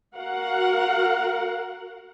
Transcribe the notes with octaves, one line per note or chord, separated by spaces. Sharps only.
F#4 A#4 F5 F#5